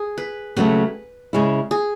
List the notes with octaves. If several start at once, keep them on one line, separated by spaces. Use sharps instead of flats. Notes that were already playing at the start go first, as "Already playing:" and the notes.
Already playing: G#4
B4
D#2 C#3 F#3 A3 B4
C#3 G#3 C#4 E4
G#4